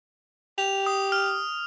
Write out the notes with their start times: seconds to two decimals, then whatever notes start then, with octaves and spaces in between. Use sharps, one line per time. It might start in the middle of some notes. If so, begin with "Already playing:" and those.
0.58 G4 F7
0.86 D#6
1.12 F6